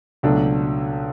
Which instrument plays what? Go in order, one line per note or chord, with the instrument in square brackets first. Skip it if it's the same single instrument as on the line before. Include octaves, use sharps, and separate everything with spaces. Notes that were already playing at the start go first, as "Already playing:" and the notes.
[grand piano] C#2 B2 F#3 A3 D4